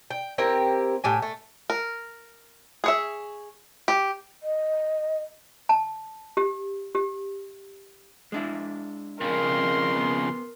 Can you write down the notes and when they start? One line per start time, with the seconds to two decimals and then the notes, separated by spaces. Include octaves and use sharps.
0.11 G5
0.38 C4 E4 G4 A#4
1.04 A2 G4 G#5
1.22 A3
1.70 A#4
2.84 G#4 C#5 E5
3.88 G4
4.43 D#5
5.69 A5
6.37 G4
6.95 G4
8.32 G#3 D4 E4
9.21 F2 C#3 A#4 C6
9.95 B3